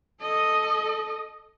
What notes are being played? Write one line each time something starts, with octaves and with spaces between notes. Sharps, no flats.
A4 D#5